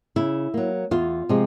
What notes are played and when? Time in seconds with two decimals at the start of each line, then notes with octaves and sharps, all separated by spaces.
0.16 C#3 E4
0.54 F#3 A#3
0.91 E2 F4
1.29 C3 F3 G#3